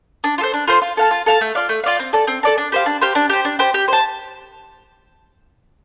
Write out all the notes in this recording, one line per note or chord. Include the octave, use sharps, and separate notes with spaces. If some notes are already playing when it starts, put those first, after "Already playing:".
D4
F4
A4 C5
D4
F4 A4 C5
F4
A4 F5 A5
F4
A4 F5 A5
A3
F4 D5 F5
A3
F4 D5 F5
C4
A4 D5 A5
C4
A4 D5 A5
D4
G4 C5 F5
D4
G4 C5 F5
D4
G4 C5
D4
G4 C5
G4
C5 A5